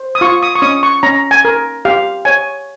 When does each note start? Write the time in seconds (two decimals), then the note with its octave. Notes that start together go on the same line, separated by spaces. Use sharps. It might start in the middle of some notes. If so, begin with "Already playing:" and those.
Already playing: C5
0.15 D#6
0.21 F4 C#6
0.42 D#6
0.55 C#6
0.62 C#4 D#6
0.83 C#6
1.03 C#4 A#5
1.31 G#5
1.45 A#4
1.85 G4 F5
2.25 C#5 G#5